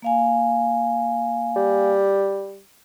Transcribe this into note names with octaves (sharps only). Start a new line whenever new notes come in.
A#3 F5 G#5
G3